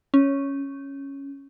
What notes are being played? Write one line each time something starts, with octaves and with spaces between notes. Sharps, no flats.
C#4